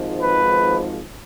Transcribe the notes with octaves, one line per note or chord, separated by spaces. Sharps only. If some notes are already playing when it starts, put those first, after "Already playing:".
Already playing: G#1 G#2 F3
B4